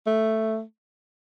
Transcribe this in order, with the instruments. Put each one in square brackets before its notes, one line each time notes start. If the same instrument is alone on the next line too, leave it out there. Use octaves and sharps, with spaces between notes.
[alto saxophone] A3